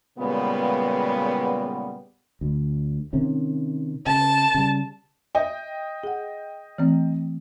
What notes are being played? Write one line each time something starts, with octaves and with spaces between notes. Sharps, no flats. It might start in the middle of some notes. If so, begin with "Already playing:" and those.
A#2 C#3 G3 G#3 B3
D2
C3 D#3 C#4
C#3 A5
C#3 G3
D#5 E5 G5
G#4 F#5
E3 A3 C4